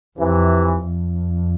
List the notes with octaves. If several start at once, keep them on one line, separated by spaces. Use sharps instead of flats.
F2 C3 E3
F2